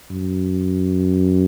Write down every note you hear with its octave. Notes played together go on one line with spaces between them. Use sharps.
F#2